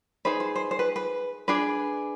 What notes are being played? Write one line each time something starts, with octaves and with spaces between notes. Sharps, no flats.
D#4 G#4 B4 C5
C5
C5
C5
B4
B4
D4 G#4 B4